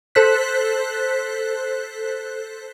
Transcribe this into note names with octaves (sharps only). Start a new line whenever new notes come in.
A4 C5 F#6 B6